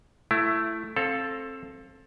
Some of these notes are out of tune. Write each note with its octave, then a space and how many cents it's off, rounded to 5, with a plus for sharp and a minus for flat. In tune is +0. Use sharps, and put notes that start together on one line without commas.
A3 +0 E4 +20
C4 +25 A4 +0 F5 +0